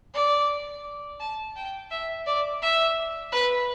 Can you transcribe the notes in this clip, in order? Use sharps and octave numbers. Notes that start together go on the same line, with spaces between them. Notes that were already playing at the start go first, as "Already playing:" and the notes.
D5
A5
G5
E5
D5
E5
B4